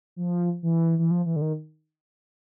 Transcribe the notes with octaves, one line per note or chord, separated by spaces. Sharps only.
F3
E3
E3
F3
E3
D3
D#3